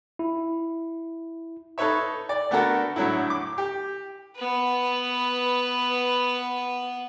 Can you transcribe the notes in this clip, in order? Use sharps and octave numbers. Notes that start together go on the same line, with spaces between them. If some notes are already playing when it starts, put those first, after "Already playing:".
E4
D#4 A4 B4 C#5 E5
D5
A3 B3 D4 F#4 A4 A#4
A2 D3 F#3 A3 E4
D6
G4
B3 B4